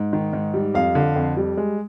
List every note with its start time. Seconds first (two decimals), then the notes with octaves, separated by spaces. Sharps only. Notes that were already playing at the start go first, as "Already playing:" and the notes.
Already playing: G#2
0.13 D#3
0.33 G#2
0.54 G3
0.74 F2 F5
0.95 D3
1.15 F2
1.37 G3
1.57 G#3